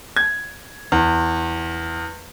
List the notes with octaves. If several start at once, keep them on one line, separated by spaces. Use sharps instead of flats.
G#6
E2